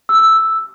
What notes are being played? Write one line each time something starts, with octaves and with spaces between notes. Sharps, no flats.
E6